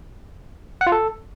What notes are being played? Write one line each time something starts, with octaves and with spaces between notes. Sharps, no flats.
F#5
F4
A4